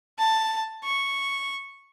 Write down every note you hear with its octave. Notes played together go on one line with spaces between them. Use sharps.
A5
C#6